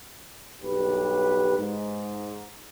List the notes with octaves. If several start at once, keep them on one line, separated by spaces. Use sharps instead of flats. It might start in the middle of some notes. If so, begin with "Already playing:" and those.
B1 G2 G4 B4
G#2